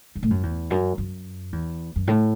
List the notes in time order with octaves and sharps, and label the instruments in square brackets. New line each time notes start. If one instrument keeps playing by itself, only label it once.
[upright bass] F#2
A2
F#2
E2
F#2
F#2
E2
F#2
A2